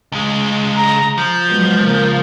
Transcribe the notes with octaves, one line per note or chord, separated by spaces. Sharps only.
C#2 G#3
A#5
F3 G6
F#3 G#3 B3
C#3 A#3